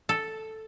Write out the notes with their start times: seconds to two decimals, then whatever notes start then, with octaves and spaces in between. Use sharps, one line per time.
0.09 A4